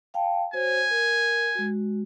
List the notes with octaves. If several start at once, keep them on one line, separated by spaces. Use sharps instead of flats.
F5 G5 A5
F#4 C5 C#5 G#5
A#4
G#3 F#4